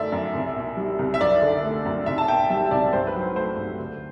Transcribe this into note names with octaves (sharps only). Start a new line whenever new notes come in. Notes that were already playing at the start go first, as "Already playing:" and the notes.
Already playing: F#2 A2 D3 A3 D5 E5
F#2
C2
B2
G3
C2
E5
F#2 D5
D3
A3
F#2
C2 E5
A5
B2 G5
G3 E5
C2 D5
G2 C5
B4
F#3
C5
A3 C5
G2
D2